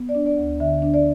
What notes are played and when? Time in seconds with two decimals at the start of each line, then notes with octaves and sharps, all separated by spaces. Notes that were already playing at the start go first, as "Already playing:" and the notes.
Already playing: B3
0.09 D5
0.15 D4
0.26 D5
0.38 D2
0.60 D3 E5
0.82 D4
0.94 D5